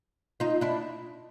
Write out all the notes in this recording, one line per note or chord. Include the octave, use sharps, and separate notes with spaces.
D#4 F4
D4 E4